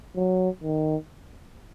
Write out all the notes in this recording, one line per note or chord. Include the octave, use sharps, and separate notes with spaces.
F#3
D#3